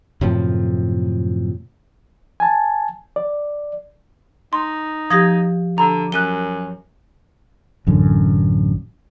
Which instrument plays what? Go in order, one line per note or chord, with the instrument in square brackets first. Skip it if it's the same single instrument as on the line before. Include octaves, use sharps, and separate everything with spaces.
[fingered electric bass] F#2 A2 C3 F3
[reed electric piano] G#5 A5
D5
[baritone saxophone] D#4 [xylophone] C6
[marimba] F3 G4 [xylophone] D#6 G#6 A#6
[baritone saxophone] D3 [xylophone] A#5 B5
[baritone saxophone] F#2 [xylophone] F#6 D#7 G7
[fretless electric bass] A1 F#2 D3